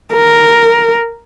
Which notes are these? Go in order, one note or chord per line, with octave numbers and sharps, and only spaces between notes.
A#4